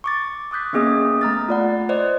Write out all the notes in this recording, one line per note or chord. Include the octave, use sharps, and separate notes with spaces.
C#6 D6 A6
D6 D#6 F#6 G6 B6
A#3 B3 C#4 G#4 D#5 D#6
A3 A#5 F6 A6
F4 D5 F#5
C5 D5 D#5